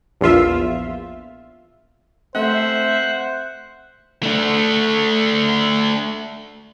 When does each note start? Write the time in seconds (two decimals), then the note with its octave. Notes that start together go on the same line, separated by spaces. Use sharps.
0.21 A#1 E2 F4 E5
2.35 A3 C4 C5 E5 F#5
4.23 A3 D4